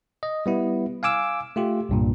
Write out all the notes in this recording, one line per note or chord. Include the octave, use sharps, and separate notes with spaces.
D#5
G3 B3 E4
F5 G#5 D6 E6
A3 F4 G4
C2 G2 A#2